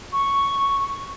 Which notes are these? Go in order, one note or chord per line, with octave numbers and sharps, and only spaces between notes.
C#6